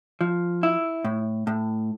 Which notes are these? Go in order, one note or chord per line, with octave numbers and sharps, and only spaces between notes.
F3
E4
A2
A2